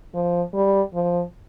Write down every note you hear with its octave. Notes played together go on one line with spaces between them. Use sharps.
F3
G3
F3